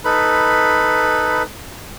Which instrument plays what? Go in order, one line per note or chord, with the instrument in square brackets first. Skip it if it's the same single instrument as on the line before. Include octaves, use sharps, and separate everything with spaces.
[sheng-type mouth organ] D#4 A4 B4 B5